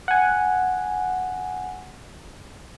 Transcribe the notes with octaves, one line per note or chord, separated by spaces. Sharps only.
F#5 G#5